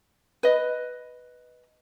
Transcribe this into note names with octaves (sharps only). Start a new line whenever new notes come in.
B4 D#5